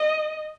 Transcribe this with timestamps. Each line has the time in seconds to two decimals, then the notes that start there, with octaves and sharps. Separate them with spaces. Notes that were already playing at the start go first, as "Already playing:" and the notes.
Already playing: D#5